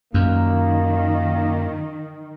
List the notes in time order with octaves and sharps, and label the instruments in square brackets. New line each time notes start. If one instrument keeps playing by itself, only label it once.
[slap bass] F#2 [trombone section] A#2 A#3 [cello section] D#3